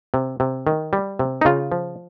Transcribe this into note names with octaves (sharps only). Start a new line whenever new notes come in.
C3
C3
D#3
G3
C3
D#4
C#3 F4
F3